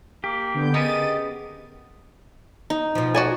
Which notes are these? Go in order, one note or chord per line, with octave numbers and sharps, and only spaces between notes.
A#3 G4
D3 B3 G6
C#3 B3 A#4 D#5 A6 D#7
D#4
B2 F3
F#4 A4 D5 G#5